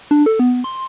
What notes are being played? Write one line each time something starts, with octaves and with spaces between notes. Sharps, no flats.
D4
A4
B3
C6